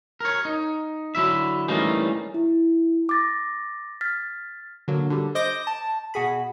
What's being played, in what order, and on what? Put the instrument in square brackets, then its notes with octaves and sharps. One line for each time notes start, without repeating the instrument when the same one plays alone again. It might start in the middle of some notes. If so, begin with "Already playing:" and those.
[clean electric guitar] A#4 C#5
D#4
D3 F#3 E4 E5
E3 G3 A3 A#3 C#4 D#4
[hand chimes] E4
D6 A6 A#6
F6 A6 B6
[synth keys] D3 F#3 A#3
D3 G3
C5 D#5 D6 G6 A#6
A5
B2 F#4 G#4 B5